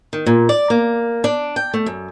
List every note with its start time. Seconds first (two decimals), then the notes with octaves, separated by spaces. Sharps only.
0.13 D#3
0.26 A#2
0.49 D5
0.70 A#3
1.24 D4
1.56 G5
1.74 A3
1.86 F#2